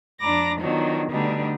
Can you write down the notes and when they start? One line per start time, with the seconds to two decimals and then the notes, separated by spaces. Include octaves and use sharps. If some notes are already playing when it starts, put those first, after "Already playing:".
0.21 F2 D4 A#5 B5 D6 A#6
0.60 D#3 F3 F#3 B3 D4 D#4
1.12 B2 D3 G3 A3 D4 D#4